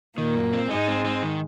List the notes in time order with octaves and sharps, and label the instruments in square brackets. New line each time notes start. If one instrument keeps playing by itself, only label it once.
[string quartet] A#2 A#3 [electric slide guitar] D#3
[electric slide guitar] F#2
C4
[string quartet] G#2 G#3 [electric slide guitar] D#4
[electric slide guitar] C4
C4
D#3